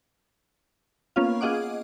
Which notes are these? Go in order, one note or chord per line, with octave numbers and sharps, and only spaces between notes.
A#3 B3 C#4 F4 F5
F4 G#4 D#5 F#5 D6